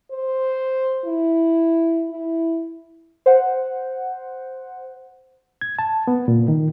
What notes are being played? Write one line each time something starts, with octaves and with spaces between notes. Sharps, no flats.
C5
E4
E4
C5 F#5
G#6
A5
B3
A#2
D#3